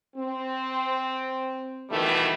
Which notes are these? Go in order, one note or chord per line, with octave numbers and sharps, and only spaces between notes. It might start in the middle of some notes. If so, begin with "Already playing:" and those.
C4
B2 D#3 E3 G3 A3